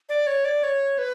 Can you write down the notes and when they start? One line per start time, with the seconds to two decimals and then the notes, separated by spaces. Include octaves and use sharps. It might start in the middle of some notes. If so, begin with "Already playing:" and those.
0.09 D5
0.27 C#5
0.45 D5
0.63 C#5
0.98 B4